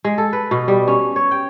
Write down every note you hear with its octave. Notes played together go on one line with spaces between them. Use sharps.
G#3
A4
B4
B2
G3
C#4
C#5
G5